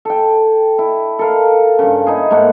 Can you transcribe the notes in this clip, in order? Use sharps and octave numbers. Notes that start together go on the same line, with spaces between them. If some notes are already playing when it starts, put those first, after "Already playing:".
A4 G5
E4
A4 A#4 F5
G2 C#3
D#4 E4 G#4
G#2 A3 A#3 F#5